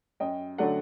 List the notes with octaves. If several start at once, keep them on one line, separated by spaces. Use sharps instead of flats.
F#2 D#5 G5
D3 F#3 A3 D5 F#5